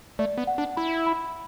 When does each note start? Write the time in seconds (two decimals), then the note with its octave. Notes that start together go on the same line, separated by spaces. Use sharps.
0.19 A3 D5
0.38 B3
0.47 F#5
0.58 D4
0.77 E4 B5
1.07 B5